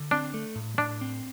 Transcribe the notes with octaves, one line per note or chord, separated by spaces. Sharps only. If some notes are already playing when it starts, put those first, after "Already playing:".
Already playing: D3
C4 D4
A3
A2
A2 D4
C4